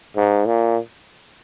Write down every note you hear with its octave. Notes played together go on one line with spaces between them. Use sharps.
G#2
A#2